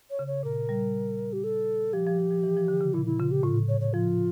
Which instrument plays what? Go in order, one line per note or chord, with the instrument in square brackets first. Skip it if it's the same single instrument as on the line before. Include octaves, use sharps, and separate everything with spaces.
[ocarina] C#5
[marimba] C#3
[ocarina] C#5
[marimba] A#2 [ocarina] A#4
[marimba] G3
[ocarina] G4
A4
[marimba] F3 [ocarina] G4
[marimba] F3
F3
F3
E3
F3
D3
C#3
[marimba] A#2 [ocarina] E4
[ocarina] E4
[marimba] C#3 [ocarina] F4
[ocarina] G4
[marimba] A2 [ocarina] F4
[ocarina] C#5
C#5
[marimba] F3 [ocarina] F4